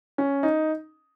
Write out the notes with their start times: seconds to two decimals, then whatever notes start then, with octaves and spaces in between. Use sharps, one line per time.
0.18 C#4
0.43 D#4